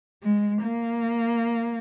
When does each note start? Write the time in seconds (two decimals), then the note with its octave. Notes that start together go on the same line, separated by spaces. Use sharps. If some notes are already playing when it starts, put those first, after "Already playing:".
0.23 G#3
0.63 A#3